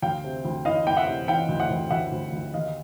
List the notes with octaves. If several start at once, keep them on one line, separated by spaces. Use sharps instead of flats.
D2 F5 G5
C3
D2
E3 D#5 F5
E3 G5
E5 F#5
C3
E3 F5 G5
D2
E5 F#5
D2
D2 E5 F#5
D2
D2
D#2 D#5 F5